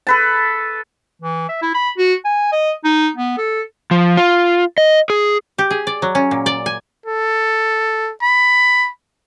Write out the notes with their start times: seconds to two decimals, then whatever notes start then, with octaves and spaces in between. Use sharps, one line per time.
0.07 A4 B4 A5
1.22 E3
1.49 E5
1.62 E4
1.75 B5
1.98 F#4
2.25 G#5
2.52 D#5
2.84 D#4
3.16 B3
3.38 A4
3.91 F3
4.17 F4
4.78 D#5
5.10 G#4
5.58 G4
5.70 G#4
5.87 D5
6.02 F#3
6.15 C#4
6.31 A#2
6.46 D5
6.66 G#5
7.06 A4
8.22 B5